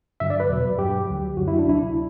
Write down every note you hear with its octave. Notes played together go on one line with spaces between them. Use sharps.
G2 D3 F#3 E5
D5
B4
E2 B2 F#3
G2 F#3 G4
D2 D3 F#3
F#2 D3 F#3 F#4
E4
D4
D2 C3 F#3 E4